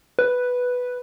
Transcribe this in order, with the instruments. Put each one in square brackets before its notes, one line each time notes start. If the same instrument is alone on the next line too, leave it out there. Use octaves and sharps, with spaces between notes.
[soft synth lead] B4